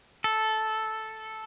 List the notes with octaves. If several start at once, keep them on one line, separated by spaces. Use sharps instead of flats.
A4